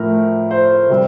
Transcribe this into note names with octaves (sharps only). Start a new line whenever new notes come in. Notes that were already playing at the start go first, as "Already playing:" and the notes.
Already playing: A2 F3 A3 A#4
C5
C3 G3 C4